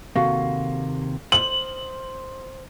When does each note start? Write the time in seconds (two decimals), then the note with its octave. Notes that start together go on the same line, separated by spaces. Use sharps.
0.16 D#2 C3 A#3 F#4 A4 F5
1.32 C5 F#7